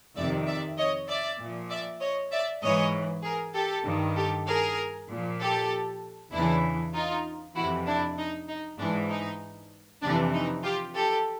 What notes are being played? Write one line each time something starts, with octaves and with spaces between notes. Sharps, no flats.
F2 C3 D#3 D5 E5
D5 E5
C#5 D#5
D5 E5
A#2 F3
D5 E5
C#5 D#5
D5 E5
G#2 E3 C#5 D#5
G#4 A#4
G4 A4
G2 D#3
G4 A4
G#4 A#4
A#2 F3
G4 A4
E2 C#3 E3 D4 E4
D#4 F4
F2 C3 E3 E4 F#4
D4 E4
D#4
D#4
G#2 E3 D4
D#4
F2 C3 E3 D4
D#4
F4 G4
G4 A4